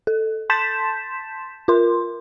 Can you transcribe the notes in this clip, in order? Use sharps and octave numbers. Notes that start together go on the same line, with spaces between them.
A4
A5 C6 G6 A6 B6 E7
F4 A#4 C6